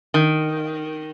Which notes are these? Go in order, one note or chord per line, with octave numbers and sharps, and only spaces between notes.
D#3